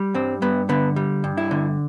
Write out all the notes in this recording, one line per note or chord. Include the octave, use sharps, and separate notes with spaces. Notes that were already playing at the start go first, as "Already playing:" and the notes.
Already playing: G3
G2 C4
G2 B3
D3 B3
G3
G2
E4
D3